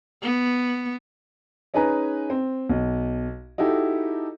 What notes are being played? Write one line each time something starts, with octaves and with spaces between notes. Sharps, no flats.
B3
C#4 D#4 G#4 B4 G#5 A#5
C4
B1
D#4 E4 F#4 G4 A4